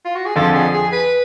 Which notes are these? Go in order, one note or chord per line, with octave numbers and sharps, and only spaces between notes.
F4
F#4
G#4
F2 D3 F3 A4
G#4
G#4
B4